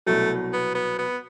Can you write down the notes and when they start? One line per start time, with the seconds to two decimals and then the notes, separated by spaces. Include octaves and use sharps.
0.06 C2 B2 F#3 A3
0.53 B3
0.75 B3
0.99 B3